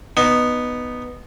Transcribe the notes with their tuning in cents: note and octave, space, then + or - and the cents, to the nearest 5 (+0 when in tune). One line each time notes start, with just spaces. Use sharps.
B3 +0 D#4 -15